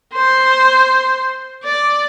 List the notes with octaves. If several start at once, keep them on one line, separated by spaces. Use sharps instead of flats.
C5
D5